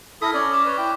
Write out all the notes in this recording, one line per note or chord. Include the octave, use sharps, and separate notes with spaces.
E4 A4 D#6 F6 A#6 B6
C#4 D5 G#6
D6 D#6
B4 C#5 B6
E4 G5